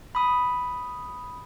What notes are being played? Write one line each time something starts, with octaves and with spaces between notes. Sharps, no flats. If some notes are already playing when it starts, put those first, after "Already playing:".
B5 D#6